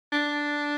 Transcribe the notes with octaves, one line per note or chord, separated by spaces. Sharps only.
D4